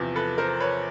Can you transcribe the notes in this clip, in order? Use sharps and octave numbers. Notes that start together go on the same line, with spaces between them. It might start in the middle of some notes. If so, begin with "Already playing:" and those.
Already playing: E2 C3 F3
A4 B4
A#4 C5
B4 C#5